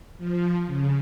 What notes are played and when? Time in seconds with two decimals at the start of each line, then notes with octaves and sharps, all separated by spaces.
0.18 F3
0.66 C#3